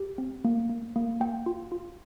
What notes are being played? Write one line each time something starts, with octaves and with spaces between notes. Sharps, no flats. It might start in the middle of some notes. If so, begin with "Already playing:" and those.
Already playing: G4
C4
A#3
A#3
A#3
A#3 G5
F4
F4